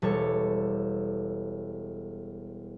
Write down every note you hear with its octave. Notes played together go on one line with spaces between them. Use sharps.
E1 G3 A4 C#5